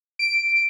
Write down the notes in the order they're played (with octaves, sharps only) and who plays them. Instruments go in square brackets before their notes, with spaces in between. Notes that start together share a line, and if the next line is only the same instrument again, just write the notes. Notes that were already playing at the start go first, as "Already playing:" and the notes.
[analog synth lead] D7